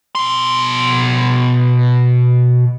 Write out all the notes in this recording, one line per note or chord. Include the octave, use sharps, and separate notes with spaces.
B2 C6